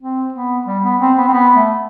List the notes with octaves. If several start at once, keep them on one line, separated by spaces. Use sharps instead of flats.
C4
B3
G3
B3
C4
B3
C4
B3
A3